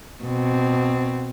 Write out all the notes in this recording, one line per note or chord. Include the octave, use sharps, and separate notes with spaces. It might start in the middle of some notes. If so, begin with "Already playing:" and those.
B2 C4